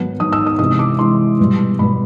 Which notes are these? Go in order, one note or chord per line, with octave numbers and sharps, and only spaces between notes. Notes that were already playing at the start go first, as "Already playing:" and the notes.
Already playing: G#2 D#3 F#3 B3
G#2 D#3 F#3 B3 D#6
E6
D#6
C3 E3 G#3 D#6
D6
C3 E3 G#3 C6
B2 G3 B3
B2 G3 B3 B5